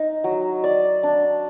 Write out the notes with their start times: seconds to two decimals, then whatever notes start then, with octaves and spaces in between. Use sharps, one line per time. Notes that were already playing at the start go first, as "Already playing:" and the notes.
Already playing: D#4
0.24 F#3
0.64 D5
1.03 D4